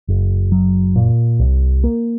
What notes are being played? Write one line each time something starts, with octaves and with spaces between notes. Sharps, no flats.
F#1
F#3
A#2
C2
A#3